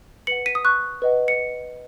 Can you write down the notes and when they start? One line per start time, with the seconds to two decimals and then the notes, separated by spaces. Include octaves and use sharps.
0.27 B4 F#5 C#7 F#7
0.46 B6 D#7
0.55 D#6
0.65 C#6 F#6
1.02 B4 D#5 F#5
1.28 C#7